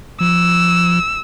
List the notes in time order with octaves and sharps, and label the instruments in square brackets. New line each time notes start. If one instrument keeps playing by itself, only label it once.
[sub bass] F3 [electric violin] E6